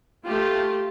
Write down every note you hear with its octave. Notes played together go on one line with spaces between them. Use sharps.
A3 F4 G4